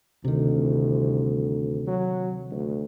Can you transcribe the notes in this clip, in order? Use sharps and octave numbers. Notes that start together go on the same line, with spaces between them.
D2 C3 D#3
C2
F#3
D2